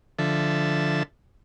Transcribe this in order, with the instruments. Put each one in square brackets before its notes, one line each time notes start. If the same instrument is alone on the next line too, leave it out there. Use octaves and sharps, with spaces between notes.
[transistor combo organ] D3 F3 A4 E5